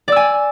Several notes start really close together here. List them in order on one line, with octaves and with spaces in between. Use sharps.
D5 E6 G#5